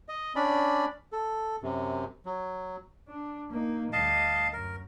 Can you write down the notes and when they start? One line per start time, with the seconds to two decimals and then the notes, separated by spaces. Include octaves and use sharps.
0.09 D#5
0.36 C#4 D4 D5 B5
1.13 A4
1.63 F#2 C3
2.26 F#3
3.08 D4
3.51 A#3 D#4
3.93 D2 G3 D#5 F5 A5
4.53 F#2 A#4